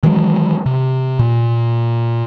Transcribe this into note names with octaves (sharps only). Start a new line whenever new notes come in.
D#3 E3 F#3 G#3
C3
A#2